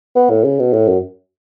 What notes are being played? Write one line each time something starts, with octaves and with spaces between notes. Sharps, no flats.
B3
A2
C#3
B2
A2
F#2